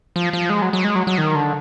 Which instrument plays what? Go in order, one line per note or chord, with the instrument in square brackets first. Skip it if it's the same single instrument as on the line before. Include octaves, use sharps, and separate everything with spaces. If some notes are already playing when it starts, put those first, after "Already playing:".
[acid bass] F3
F3
G#3
F#3
F#3
G#3
F#3
F#3
D#3
D3